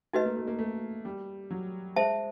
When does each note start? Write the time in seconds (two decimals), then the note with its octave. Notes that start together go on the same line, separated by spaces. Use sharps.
0.13 A3 D#4 F#4 B4 D#5
0.25 A#3
0.36 A3
0.47 A#3
0.59 A3
1.05 G3
1.51 F#3
1.96 G#3 C5 E5 A5